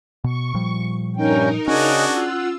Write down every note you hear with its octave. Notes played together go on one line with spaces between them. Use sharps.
B2 C#6
A#2 F3 G3
G2 C#4 D#4 A#4 G5
C#3 C#4 D4 F#4 G#4 D#5 G#5
F4 F#5 E6